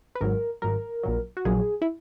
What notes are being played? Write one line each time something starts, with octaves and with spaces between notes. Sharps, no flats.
B4
G#1 G#2 F#3 A#4
G#1 G#2 F#3 A#4
A#1 A#2 F#3
F#4
A#1 A#2 F#3 G#4
E4